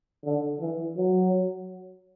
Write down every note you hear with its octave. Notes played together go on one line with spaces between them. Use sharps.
D3
E3
F#3